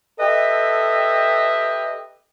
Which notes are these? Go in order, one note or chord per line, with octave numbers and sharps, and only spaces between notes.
G4 A4 B4 D#5 E5 G5